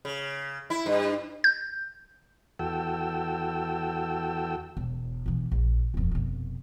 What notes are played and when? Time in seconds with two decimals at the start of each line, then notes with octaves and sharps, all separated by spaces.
0.05 C#3
0.70 E4
0.86 G2
1.44 G6
2.59 E2 F#4 A4 G5 E6
4.77 E1
5.26 B2 E3
5.52 A#1
5.94 D#1 F2
6.11 F1 B2